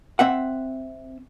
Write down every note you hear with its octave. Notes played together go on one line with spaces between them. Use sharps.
C4 E5 F#5